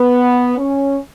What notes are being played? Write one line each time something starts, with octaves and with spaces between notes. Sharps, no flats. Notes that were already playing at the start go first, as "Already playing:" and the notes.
Already playing: B3
C#4